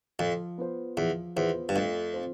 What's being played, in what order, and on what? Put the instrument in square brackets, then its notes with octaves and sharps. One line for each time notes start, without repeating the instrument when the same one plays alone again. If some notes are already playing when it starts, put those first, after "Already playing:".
[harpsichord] F2 [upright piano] F3
[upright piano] B3 F4 C5
[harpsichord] E2 [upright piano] F3
[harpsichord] E2 [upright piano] B3 F4 C5
[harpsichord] G2
[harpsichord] F2 [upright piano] A3
[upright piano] C4 F4 C5